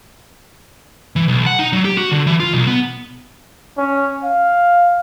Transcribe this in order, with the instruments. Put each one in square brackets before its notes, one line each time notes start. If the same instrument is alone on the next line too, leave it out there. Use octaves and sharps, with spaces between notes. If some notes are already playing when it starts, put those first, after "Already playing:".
[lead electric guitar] E3
B1
F#5
D#4
F#3
G4
F#4
D3
E3
F4
B1
B3
[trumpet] C#4
F5